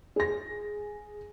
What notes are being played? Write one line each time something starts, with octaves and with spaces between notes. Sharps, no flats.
G#4 A#6